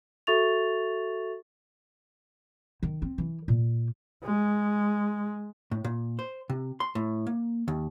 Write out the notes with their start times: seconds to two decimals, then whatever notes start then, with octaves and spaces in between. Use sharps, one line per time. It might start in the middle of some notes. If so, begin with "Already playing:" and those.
0.27 F#4 A4 E5 C#6 A6 F7
2.83 D#3
3.02 C4
3.18 E3
3.48 A#2
4.23 G#3
5.71 A2
5.84 A#2
6.19 C5
6.50 C3
6.80 C6
6.95 A2
7.27 A#3
7.68 D#2